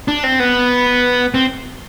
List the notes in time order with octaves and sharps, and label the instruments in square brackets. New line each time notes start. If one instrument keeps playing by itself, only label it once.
[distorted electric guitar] D4
C4
B3
C4